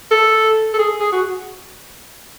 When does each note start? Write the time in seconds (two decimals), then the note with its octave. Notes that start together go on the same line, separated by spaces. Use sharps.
0.11 A4
0.74 A4
0.79 G#4
1.00 G#4
1.12 F#4